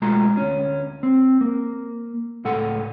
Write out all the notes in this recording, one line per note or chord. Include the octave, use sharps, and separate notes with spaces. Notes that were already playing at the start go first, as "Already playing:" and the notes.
B1 G#3 A3 F4 A#5
D2 C#4
C4
A#3
C#2 A2 A4 F#5